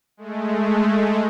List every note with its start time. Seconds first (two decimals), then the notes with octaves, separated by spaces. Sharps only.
0.17 G#3 A3